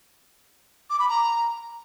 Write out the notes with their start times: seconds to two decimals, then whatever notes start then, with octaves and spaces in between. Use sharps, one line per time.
0.90 D6
0.99 B5
1.09 A#5